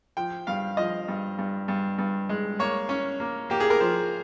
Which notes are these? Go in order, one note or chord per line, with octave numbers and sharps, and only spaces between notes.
F3 G5
G2 F5
F3 D#5
G2
G2
G2
G2
G#3
A#3 C#5
C#4
A#3
A#3 G4
G#4
A#4
F3 C5